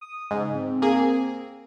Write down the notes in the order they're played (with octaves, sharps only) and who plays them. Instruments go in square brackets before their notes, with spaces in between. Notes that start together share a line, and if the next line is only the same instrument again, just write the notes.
[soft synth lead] D#6
[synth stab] G#2 [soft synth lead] C#3
[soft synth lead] C4
[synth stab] A#3 G#4